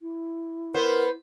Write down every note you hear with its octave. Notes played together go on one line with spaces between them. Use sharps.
E4
B3 A#4 C5